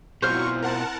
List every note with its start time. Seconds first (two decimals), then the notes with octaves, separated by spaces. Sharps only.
0.22 B2 E3 F#3 C4 F4 C5 C#6 F6
0.62 A#4 F#5 A5